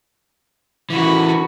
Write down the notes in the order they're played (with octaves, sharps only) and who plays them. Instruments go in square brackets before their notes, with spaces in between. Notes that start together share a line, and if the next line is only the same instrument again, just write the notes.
[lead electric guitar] C#3 E3 [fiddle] F#4 B5